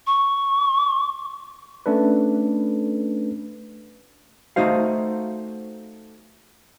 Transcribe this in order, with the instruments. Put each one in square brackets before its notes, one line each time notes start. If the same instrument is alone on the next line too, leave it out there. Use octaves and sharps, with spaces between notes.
[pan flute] C#6
[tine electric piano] A3 C#4 D4 A4 B4
[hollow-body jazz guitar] A3 D#4 F#4 C5 F5